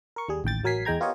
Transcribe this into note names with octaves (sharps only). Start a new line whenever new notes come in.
A#4 C#6
D#2 G3 G#4
A1 D#2 G5 A6
A1 F#3 A#4 G#5 B6 C7
E2 G#3 G5 A#5 G#6
B3 F4 G4 A#4 C#5 D#5